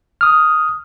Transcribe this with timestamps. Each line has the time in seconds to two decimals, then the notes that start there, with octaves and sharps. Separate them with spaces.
0.21 D#6 F6